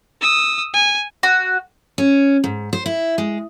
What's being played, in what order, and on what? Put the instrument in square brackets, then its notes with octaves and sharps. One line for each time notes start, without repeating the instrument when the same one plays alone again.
[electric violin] D#6 E6
G#5
[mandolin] F#4
[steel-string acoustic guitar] C#4
G#2
C5
E4
G#3